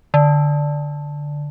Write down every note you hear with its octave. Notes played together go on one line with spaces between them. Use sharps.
D3